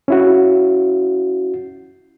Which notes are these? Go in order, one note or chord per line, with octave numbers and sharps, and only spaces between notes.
C#4 E4 F#4